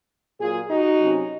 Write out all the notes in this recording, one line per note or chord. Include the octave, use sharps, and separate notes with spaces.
A#2 F#3 A#3 F4 G#4
D#4 F#4
C3 F#3 C#4